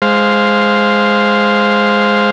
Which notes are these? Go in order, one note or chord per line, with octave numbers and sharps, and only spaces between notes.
G#3 C5 F5